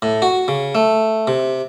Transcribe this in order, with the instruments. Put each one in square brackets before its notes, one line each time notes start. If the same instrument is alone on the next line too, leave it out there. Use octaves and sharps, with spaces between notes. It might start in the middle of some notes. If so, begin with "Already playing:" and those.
[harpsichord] A2
F#4
C#3
A3
C3